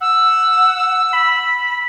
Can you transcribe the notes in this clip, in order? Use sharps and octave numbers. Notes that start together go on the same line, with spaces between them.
F#5 E6
B5